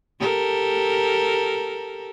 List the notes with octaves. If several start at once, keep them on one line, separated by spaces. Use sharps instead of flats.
G4 A4 A#4